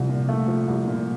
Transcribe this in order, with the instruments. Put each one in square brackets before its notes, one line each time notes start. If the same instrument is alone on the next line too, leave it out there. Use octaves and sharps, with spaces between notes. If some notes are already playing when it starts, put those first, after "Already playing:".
Already playing: [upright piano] C2 F3 [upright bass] C3
[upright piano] A#2
A3
F3
C2
A#2